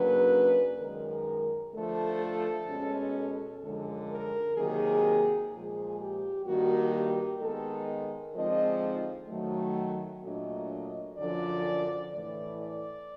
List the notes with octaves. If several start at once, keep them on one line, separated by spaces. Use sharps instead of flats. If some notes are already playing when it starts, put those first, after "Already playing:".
Already playing: F#2 C#3 F#3 A#3 D4 B4
F#2 D#3 G#3 A#4
D3 F3 A3 A4
A4
B2 G#3 C#4
A4
F#2 D3 F3 G#3
A#4
C3 D#3 F#3 A#3 G#4
A#2 F3 G#3 G#4
G4
G2 D#3 G3 A#3 F#4
G4
D#3 G#3 B3 A4
A#4
D3 F3 G#3 C4 D#4 D#5
D#3 F#3 A3
A#2 F#3 A3 D4 D#5
F#2 D3 F3 D5
A2 E3 A3 D5
D5